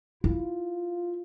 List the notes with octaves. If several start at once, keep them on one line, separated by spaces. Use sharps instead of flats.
E4 F4